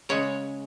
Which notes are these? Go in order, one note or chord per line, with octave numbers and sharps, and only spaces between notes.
C#3 G#3 C#5